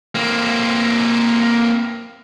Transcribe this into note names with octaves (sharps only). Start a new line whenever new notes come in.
A#3 C4